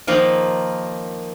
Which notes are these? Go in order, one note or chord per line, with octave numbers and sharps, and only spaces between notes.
D#3 F3 A#3